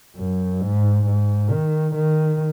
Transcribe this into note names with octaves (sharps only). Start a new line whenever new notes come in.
F#2
G#2
G#2
D#3
D#3